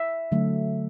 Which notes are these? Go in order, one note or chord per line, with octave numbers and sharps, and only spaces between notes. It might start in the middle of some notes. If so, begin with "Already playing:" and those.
Already playing: E5
D3 F#3 A3